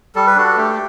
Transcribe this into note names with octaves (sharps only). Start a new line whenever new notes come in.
G3 A4
B4
D4 F#4 A4
A3 G4